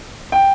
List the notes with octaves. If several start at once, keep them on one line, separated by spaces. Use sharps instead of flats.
G5